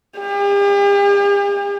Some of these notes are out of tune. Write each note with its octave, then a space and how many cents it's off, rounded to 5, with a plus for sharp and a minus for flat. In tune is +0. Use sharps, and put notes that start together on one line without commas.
G4 +45